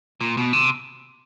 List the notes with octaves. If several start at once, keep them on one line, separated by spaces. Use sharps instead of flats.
A#2
B2
C3